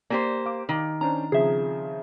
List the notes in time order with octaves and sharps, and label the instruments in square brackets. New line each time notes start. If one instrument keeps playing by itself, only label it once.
[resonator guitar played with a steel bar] A#3 G4 C5 [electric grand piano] D5
[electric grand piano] F5 D6
[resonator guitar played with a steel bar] D#3
[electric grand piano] C#4 D4 C5 [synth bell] A#5
[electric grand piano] C#3 F3 C4 [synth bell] G#4 E5